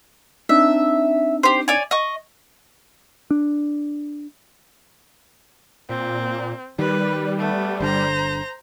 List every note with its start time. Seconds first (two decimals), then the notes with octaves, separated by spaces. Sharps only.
0.49 C4 D4 D#4 E5
1.43 G4 C5
1.68 C#5 D5 G#5
1.91 D#5 C#6
3.31 D4
5.89 A#2 C4
6.79 D#3 G3 B4
7.39 A3 B3
7.80 G1 D3 C5 A#5